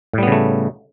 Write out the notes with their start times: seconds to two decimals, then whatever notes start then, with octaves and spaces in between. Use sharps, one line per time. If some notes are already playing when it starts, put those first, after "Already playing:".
0.13 A2
0.18 G3
0.23 B3
0.27 C#3
0.32 A3